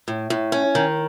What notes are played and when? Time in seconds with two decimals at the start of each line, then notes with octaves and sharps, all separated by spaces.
0.08 A2
0.30 A2
0.52 C#4
0.75 D#3